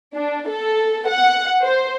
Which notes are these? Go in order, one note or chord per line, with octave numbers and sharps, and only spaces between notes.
D4
A4
F#5
C5